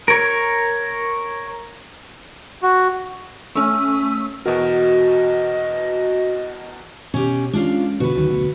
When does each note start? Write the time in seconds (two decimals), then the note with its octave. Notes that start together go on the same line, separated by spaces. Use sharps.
0.08 A#4 C#5
2.62 F#4
3.55 A3 C#4 E6
4.46 E2 B2 F#4 A#4 D#5
7.14 B2 C#4 G4
7.53 G#3 C#4 D4 F4 F5
8.00 B2 D3 B3 F#4 B4
8.16 D2 D#3 F#3
8.30 F1 D2 B2